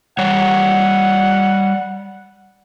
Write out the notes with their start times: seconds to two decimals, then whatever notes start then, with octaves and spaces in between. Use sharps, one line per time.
0.19 G3 C#5 F#5